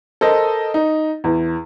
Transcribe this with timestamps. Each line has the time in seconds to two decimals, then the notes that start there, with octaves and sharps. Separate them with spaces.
0.21 A4 A#4 C5 D#5
0.74 D#4
1.24 E2